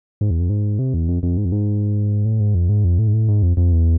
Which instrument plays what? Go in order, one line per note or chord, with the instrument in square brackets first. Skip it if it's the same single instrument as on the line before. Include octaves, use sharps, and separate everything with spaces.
[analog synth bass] G#2
E2
F2
G#2
C3
E2
F2
F2
G#2
F2
G#2
A2
G#2
F2
G#2
F2
A2
G#2
A2
G#2
F2
F2
E2